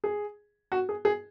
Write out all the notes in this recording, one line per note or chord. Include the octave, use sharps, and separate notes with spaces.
G#4
F#4
G#4
G#4